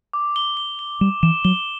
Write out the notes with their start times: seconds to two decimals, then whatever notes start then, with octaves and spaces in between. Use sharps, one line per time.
0.13 D6
0.36 G7
0.57 G7
0.79 G7
1.01 G3 E7
1.23 E3 E7
1.45 F#3 G7